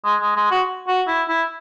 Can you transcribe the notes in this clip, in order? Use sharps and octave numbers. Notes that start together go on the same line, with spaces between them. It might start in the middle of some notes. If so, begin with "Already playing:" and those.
G#3
G#3
G#3
F#4
F#4
E4
E4